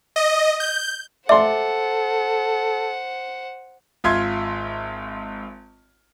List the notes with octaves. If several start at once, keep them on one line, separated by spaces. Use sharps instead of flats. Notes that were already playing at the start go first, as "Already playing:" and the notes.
D#5
G6
A4 C5 D5 E5 F#5 C6
G#1 F4 E5 C6 G#6